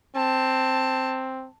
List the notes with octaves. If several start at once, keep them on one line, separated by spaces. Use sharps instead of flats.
C4 A5